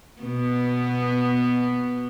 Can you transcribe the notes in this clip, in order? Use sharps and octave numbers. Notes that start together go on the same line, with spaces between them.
B2 B3